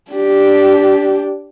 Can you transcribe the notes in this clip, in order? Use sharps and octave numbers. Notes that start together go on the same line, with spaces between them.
D4 G4